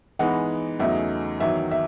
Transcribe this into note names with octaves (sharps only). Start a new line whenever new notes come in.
E3 G#3 B3 D#4 F#5
E2 C#3 F#3 A3 D#4 E5
E2 D#3 F#3 E5
E5